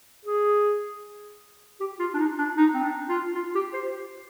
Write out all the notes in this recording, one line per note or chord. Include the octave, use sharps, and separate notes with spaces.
G#4
G4
F4
D4
D#4
D4
D#4
C4
D4
F4
F4
G4
C5